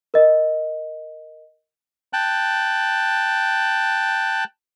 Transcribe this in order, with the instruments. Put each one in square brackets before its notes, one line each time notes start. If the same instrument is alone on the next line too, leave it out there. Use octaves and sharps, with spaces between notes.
[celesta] A#4 D#5
[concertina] G5 A5 F#6